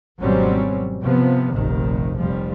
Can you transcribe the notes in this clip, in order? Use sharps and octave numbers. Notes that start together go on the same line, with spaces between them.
G#1 B2 F#3 G3 C4 C#4
C3 F3 B3
F1 A#1 C3 D#3
F1 F3 G3